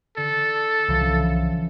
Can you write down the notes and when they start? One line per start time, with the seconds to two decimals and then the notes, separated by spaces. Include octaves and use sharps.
0.17 D3 A4
0.89 C2 C#3 E3 F3